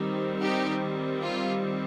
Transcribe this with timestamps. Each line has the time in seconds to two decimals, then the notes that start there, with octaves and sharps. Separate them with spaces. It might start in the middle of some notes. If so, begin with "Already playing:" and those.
Already playing: D#3 G3 C4 D#4
0.41 D#4 G4
1.22 F4